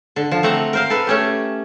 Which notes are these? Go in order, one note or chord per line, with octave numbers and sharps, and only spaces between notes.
D3
F3
A3 C4 F#5 A#5
A#4 C5 F5
A4 B4
A3 C#4 G4